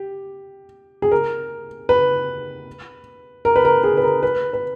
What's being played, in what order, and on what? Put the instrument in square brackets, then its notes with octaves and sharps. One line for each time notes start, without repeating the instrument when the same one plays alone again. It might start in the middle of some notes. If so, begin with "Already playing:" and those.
Already playing: [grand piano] G4
G#4
A#4
B4
A#4
B4
A#4
G#4
B4
A#4
B4
B4